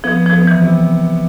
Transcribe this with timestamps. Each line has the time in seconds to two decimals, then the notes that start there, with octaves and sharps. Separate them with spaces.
0.04 F3 B3
0.26 F3
0.33 B3
0.47 E3
0.61 C3